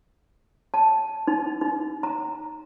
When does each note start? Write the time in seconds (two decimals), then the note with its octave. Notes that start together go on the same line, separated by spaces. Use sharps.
0.74 A5
1.28 D#4
1.61 D#4
2.03 A#5